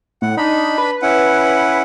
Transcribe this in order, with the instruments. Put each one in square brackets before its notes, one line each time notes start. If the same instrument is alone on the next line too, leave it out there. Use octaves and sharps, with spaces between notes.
[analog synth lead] A2 [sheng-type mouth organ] F#5
[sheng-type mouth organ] D4 B5 [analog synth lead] D#4
[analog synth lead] B4
[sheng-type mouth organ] C#4 E4 F#5